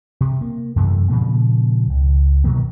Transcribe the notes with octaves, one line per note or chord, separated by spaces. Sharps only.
C3
A#3
F#2 C3 E3 A3
A#2 C#3 F3 A#3
C#2
B2 D#3 F#3 A#3